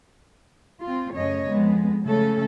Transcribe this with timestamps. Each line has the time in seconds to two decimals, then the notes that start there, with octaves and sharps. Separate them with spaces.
0.84 C4 F4
1.14 F#2 C#3 A3 C#5 D#5
1.49 F2 G#3 B3
2.05 C#3 A3 C#4 A4